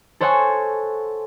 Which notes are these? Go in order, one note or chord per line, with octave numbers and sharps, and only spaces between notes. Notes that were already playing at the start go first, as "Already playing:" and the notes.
A4 C5 C#5 F#5 G#5 C#6